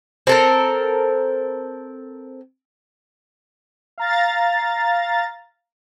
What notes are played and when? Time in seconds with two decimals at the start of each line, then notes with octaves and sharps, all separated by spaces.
0.27 C4 A4 A#4
3.98 F5 A#5 A6